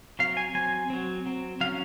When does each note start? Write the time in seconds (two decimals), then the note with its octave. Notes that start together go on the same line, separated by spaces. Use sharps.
0.19 F#3 C4 F5
0.37 G#5
0.54 F#3 C4 G#5
0.90 F#3 C4
1.26 F#3 C4
1.61 F#3 C#4 F5